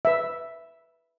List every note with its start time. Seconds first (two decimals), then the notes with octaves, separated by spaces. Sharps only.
0.05 B4 E5